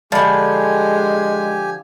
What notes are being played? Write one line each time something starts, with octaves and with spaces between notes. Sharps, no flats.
D3 F3 G#3 G4 D5 G#5 B5